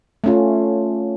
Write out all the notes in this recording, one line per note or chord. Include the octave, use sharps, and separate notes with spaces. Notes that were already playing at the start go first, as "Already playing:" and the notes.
A3 C#4 F4